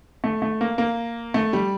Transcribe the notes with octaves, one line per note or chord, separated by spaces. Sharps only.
A3
A3
A#3
A#3
A3
G3